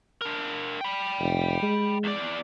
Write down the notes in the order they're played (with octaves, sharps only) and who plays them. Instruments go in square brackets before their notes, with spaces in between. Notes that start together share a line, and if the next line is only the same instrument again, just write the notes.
[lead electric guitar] D4 A#4
G5 B5
[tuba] F1
G#3
[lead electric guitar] E2 D5